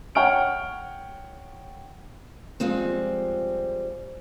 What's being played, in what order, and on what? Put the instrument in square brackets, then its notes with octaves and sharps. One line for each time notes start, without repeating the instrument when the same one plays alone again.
[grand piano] C#5 F#5 G5 C#6 F6 D7
[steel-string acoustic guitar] F3 G3 G#3 C4